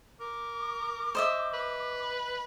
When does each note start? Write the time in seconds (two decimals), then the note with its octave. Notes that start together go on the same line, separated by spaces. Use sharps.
0.20 A#4 D6
1.15 C5 D#5 E5
1.54 B4